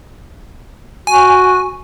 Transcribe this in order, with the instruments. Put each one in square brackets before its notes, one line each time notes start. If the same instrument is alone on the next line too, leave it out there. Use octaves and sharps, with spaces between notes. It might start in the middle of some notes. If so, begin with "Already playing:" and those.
[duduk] F#4 [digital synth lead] G#5